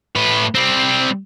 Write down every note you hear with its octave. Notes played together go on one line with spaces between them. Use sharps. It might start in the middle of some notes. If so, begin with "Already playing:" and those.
A2 B4
G3 C4